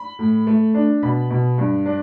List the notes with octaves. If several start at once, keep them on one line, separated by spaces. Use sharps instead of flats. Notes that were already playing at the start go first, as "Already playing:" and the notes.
Already playing: B5
A2
A3
D4
B2 B5
B2
G2
D4